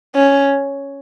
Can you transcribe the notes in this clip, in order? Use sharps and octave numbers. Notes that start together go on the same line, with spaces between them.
C#4